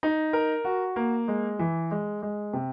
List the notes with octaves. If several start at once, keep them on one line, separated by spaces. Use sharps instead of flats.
D#4
A#4
F#4
A#3
G#3
E3
G#3
G#3
C3